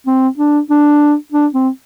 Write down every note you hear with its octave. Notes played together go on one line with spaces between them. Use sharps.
C4
D4
D4
D4
C4